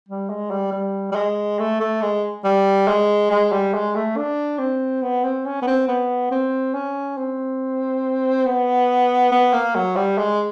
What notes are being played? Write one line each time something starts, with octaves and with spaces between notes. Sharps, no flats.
G3
G#3
G3
G3
G3
G#3
A3
A3
G#3
G3
G#3
G#3
G3
G#3
A3
D4
C4
B3
C4
C#4
B3
C4
B3
C4
C#4
C4
B3
B3
A#3
F#3
G3
G#3